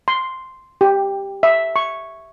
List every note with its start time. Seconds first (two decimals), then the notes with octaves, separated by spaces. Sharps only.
0.08 C6
0.81 G4
1.43 E5
1.76 C#6